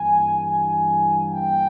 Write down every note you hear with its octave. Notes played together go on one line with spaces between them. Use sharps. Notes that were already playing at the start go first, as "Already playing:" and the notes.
Already playing: G2 E3 A#3 G#5
G#5
G5